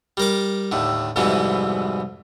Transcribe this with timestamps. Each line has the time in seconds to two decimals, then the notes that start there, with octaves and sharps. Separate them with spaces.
0.17 G3 A#4 D6
0.72 D#2 A2 D3
1.16 C2 F2 G#2 B2 E3 B3